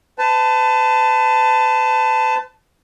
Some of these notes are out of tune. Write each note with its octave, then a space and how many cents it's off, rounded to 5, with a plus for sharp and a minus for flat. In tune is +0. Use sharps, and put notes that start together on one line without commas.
B4 +45 A5 +5